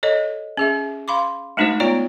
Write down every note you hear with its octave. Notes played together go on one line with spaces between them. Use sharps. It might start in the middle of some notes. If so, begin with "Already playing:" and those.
A4 C#5 D#5
C#4 G#4 E5
F5 B5 C6 D6
G#3 A3 D4 D#4 F#4 C5
B3 F4 C#5 D5 A#5